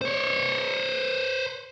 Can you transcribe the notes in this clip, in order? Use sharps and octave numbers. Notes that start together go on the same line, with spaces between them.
C5 C#5